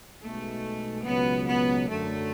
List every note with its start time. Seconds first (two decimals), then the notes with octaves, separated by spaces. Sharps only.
0.22 B1 B2 G#3 A3
1.04 C#2 B2 F#3 B3
1.47 B3
1.88 F#2 D3 F#3 A3